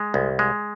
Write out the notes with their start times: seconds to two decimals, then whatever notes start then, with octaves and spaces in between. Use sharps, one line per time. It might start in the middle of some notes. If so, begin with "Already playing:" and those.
Already playing: G#3
0.14 C2
0.39 G#3